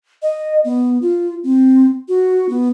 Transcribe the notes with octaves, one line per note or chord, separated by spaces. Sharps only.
D#5
B3
F4
C4
F#4
B3